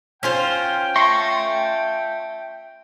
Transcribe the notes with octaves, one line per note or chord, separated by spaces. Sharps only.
C#4 F4 C5 G5
E5 A5 C6 C#6 A#6